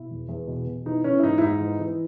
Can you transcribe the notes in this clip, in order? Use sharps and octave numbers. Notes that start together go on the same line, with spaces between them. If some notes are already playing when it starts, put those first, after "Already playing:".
Already playing: B2 E4
E2
E2
B2
B2
E3 D#4
E3 C#4
E4
G#2 D#4
E4
G#2 D#4
E3
E3